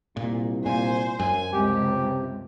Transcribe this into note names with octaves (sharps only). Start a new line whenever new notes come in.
C2 A#2
A#2 C5 G#5
F#2 G#5
C#2 C3 G4